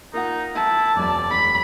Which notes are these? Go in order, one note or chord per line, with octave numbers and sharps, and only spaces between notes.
A#3 D#4 F4 F#5
E4 A5
E1 F#2 D5
B5